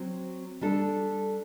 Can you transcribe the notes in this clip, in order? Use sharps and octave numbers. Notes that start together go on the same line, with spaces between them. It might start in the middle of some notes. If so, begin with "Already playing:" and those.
Already playing: F#3 C4 F#4
G3 D4 A4